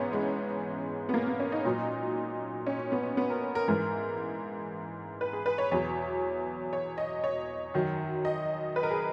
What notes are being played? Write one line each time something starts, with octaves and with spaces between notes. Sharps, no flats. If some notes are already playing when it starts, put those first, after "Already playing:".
Already playing: G#2 E3 B3 C#4
G#3
B3
A#3
B3
C#4
D#4
A#2 F#3
C#4
B3
B3
A#4
A#4
G#2 E3 A#4
B4
G#4
B4
C#5
E2 B2 F#3 C#5
C#5
D#5
C#5
F#2 D#3 F#3
D#5
B4
A#4
G#4